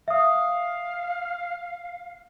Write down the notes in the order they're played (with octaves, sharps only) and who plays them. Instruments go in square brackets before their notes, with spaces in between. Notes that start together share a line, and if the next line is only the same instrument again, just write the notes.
[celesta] E5 D#6 [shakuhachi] F5